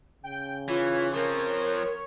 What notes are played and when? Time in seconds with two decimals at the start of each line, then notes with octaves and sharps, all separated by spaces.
0.23 C#3 G5
0.68 E3 F4 C#5
1.14 F3 C4 A#4